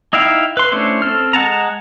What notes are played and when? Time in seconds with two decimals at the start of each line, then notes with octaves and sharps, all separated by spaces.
0.13 D#4 E4 E5 F5 G5
0.57 B4 C6
0.72 A3 C#4 D4 E4 C5
1.02 C4 A4 F6
1.33 G#3 F#5 A5 A#5